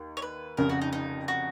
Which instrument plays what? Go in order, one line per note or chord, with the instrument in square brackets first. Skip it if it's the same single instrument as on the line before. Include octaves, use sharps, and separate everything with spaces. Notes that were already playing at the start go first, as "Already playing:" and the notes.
Already playing: [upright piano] D#2
[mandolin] C#5
B4
[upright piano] F1 F2 C#3 [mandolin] A#4
[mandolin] F#4
D#4
D#4
F#4